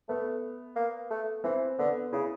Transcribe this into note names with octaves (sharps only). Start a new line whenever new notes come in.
A3 B3
A#3
A3
E3 C4
D3 B3
C#3 E4